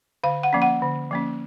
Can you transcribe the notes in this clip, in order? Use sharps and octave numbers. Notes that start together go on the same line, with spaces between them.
D3 F5
F#5
F3 A#3 C#4
F#5
D3
F3 A#3 C#4